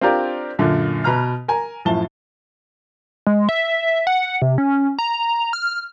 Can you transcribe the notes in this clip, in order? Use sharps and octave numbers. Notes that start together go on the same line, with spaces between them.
C4 D4 F4 G4 A#4 D5
F#2 A#2 D3
B2 B4 A#5 F6
A#4 G#5 A#5
F#2 A2 F3 A5 G7
G#3
E5
F#5
C3
C#4
A#5
F6